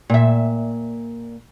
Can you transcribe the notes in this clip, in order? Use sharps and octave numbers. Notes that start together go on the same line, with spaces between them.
A#2 E5